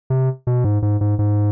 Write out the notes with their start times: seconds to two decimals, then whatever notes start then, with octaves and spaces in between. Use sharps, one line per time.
0.10 C3
0.47 B2
0.64 G#2
0.82 G#2
1.01 G#2
1.19 G#2